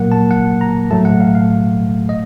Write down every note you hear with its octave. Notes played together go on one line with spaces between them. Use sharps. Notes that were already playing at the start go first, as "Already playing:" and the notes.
Already playing: A#2 F#3 A#3 F#5
A5
F#5
A#5
A2 F#3 A3 A5
F#5
F5
F5
D#5